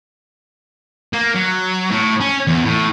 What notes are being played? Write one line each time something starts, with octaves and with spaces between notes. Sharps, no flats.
A#3
F#3
A2
C#4
E2
A2